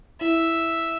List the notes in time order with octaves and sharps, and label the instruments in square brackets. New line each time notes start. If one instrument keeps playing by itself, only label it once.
[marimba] E4 [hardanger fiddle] E5